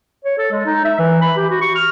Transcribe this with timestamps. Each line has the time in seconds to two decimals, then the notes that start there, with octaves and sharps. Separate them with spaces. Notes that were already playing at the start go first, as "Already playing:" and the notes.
0.24 C#5
0.38 A4
0.51 G#3
0.66 D#4
0.85 E5
0.99 E3
1.22 B5
1.36 G4
1.50 F#4
1.61 C#6
1.76 F6